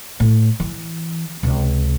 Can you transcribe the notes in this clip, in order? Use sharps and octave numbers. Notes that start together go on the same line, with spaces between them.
A2
E3
C#2 C3